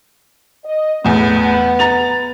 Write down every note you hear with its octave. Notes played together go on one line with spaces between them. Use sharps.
D#5
E2 A2 B3
A#5 A6 F7